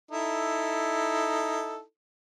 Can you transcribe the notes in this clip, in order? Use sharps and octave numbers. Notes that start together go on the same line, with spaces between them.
D#4 E4 A4